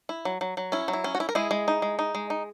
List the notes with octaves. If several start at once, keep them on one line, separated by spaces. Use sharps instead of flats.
E4
F#3
F#3
F#3
C#4 E4
F#3
E4
C#4
F#4
E4
A#4
G#3 E4 G#4
G#3
D#4
G#3
D#4
G#3
D#4